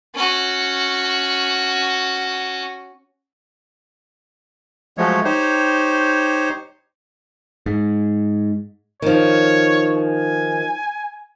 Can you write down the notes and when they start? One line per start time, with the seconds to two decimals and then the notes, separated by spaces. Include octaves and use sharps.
0.15 C#4 F#4
4.98 F3 F#3 G#3 A3 C#5
5.25 D#4 G4 C5 C#5
7.66 G#2
9.02 D#3 F3 C#5
9.97 G#5